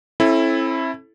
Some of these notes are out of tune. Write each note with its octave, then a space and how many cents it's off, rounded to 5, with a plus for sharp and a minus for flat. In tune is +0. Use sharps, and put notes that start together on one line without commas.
C4 +45 E4 +0 A4 -15